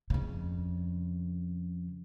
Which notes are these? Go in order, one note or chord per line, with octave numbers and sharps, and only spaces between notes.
F2 C#3